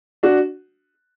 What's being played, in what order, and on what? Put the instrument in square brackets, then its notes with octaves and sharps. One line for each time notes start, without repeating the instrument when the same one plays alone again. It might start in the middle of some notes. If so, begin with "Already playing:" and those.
[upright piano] D4 F#4